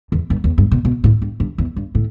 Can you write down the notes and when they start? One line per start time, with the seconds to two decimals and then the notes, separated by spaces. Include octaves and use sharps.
0.12 E2
0.30 G2
0.44 E2
0.58 G2
0.72 B2
0.85 B2
1.04 A2
1.22 G2
1.40 G2
1.58 E2
1.76 G2
1.95 A2